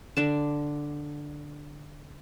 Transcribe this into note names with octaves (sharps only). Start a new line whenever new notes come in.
D3 D4 A5